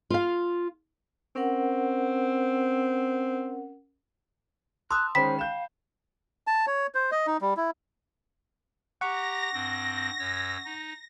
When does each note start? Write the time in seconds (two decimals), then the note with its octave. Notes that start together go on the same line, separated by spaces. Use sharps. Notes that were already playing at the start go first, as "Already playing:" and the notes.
0.10 F4 F5
1.36 C4 C#4 A#4 F#5
4.91 A5 C6 D#6 E6 F#6
5.15 D#3 G#3 C#4 C5 G5 B5 B6
5.39 F5 G6 E7
6.47 A5
6.67 C#5
6.95 C5
7.12 D#5
7.27 D#4
7.41 G3
7.57 E4
9.01 G4 F#5 A#5 C#6 A#6
9.54 G2 C4
10.19 F#2 C#5 E6
10.65 D#4